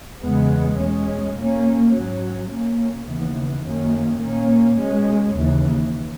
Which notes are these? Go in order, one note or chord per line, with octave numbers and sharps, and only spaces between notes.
E2 C#3 G#3 B3
B2 G#3 C#4
B2 A#3 C#4
G#2 F#3 C#4
B2 A#3 C#4
D#2 C#3 E3 B3
F#2 D#3 A#3 C#4
A#2 A#3 C#4
B2 G#3 C#4
D#2 C#3 E3